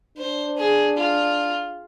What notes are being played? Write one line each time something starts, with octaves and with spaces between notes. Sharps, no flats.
D4 C5
G#4
F4